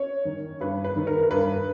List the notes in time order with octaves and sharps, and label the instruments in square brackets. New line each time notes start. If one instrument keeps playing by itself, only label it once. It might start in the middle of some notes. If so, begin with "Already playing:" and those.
Already playing: [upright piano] C#4 C#5
D#3
G2 B4
B4
D#3
A#4
A#4
G2 B4